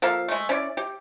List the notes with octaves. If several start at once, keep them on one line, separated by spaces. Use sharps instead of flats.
F3 A#3 A4 F5
G#3 A3
C#4 E4 D5
G4